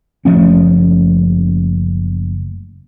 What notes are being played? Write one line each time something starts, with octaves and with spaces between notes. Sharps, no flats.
F#1 F3 A3 C#4